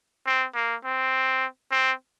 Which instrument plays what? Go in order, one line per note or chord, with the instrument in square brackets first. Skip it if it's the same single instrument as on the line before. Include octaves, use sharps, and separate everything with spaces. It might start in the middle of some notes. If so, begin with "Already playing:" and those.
[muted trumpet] C4
A#3
C4
C4